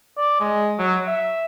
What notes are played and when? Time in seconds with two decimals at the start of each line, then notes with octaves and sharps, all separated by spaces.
0.17 D5
0.40 G#3
0.79 F#3
1.07 E5